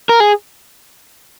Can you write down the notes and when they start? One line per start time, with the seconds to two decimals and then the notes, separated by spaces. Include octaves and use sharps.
0.09 A#4
0.20 G#4